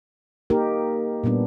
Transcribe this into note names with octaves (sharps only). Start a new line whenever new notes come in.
A#3 D#4 G4 A#4
A#2 G3 B3 D4